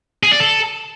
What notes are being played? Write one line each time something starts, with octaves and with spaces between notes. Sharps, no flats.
G#4
D5
A4